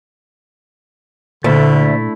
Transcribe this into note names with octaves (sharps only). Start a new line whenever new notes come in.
D2 A#2 D3 A3 E4